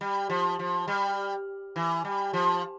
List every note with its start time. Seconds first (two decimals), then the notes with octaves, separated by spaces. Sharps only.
0.01 G3
0.30 F3
0.59 F3
0.88 G3
1.76 E3
2.05 G3
2.33 F3